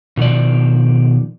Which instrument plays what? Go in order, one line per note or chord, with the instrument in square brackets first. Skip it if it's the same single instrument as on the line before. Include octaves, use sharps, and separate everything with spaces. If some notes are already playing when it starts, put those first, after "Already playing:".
[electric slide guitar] B2 D#3 F3 D5